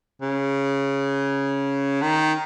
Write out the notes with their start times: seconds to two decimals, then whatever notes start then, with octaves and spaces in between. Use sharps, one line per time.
0.22 C#3
2.02 D#3